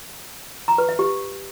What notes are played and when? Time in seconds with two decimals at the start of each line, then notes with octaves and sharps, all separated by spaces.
0.68 A#5
0.78 B4
0.89 E5
0.99 G4